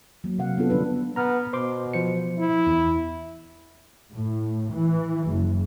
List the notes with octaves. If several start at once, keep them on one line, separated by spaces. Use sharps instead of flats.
F#3 A#3
C3 F#3 F5 F#5
B3 C#4 D4 F4 A4
D3 G3 D4 B4
B3 A#5 F6
B2 C5 C6 D6
F3 C5 C#7
E4
E2
A2
E3
F#1